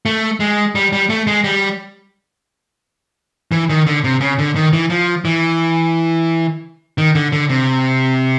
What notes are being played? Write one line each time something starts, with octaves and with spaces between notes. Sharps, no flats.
A3
G#3
G3
G3
A3
G#3
G3
E3
D#3
D3
C3
C#3
D3
D#3
E3
F3
E3
D#3
D3
D3
C3